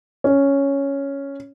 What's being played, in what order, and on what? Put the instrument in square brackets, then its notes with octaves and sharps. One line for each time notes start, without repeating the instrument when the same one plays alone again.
[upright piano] C#4